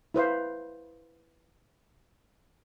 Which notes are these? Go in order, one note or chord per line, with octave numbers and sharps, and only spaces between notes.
E4 B4 C5 F5